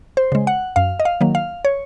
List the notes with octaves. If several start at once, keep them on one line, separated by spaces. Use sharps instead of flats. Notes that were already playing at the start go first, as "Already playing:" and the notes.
C5
C#3 G#3
F#5
F#2 F5
D#5
F5
D#3 F#3 A#3
F5
C#5